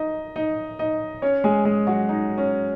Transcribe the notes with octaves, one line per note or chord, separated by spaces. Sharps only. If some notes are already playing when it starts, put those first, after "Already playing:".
Already playing: D#4 D#5
D#4 D#5
D#4 D#5
C#4 C#5
G#3 G#4
G#3 G#4
F#3 F#4
D#4
C#4